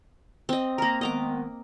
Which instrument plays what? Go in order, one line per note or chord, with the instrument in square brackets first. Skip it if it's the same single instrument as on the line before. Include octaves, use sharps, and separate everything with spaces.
[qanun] C4 D#5
[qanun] A#3 A#4 [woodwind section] A#5
[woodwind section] D#3 G#3 B3 [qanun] D#5 A#5 D6